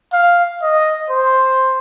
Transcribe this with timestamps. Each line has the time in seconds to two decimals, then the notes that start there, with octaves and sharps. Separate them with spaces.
0.13 F5
0.62 D#5
1.10 C5